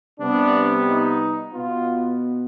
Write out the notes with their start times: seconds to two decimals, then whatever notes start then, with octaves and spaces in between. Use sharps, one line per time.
0.20 C3 G3 B3 D4
0.87 D#4
1.53 B2 B3 F4